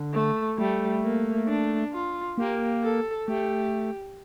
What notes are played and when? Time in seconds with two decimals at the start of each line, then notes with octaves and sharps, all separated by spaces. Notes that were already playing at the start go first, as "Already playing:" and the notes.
Already playing: D3
0.13 A3
0.58 G3 A3
1.03 A#3
1.48 D4
1.93 F4
2.38 A#3 G4
2.83 A4
3.28 A3 G4